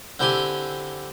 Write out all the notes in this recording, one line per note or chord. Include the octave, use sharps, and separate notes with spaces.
D3 C4 E4 G4 G5 G#5